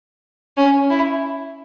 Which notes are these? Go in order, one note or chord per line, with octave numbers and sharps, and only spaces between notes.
C#4
E4